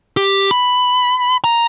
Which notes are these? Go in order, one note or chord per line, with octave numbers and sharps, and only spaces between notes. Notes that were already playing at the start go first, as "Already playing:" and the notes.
G4
B5
A#5